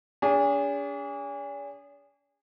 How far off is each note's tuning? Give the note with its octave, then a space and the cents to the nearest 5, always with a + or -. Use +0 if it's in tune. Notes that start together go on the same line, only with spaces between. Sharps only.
D4 -45 G#4 -30